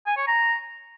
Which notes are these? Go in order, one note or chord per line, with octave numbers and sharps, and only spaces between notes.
G#5
C#5
A#5